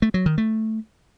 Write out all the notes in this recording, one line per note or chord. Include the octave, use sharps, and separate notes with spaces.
A3
F#3
D#3
A3